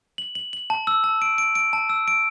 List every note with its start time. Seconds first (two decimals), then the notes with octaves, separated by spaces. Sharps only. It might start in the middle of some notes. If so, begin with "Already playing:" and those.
0.18 F#7
0.35 F#7
0.53 F#7
0.70 A5
0.87 E6
1.04 A5
1.22 D7
1.38 D7
1.55 D7
1.73 A5
1.90 E6
2.08 D7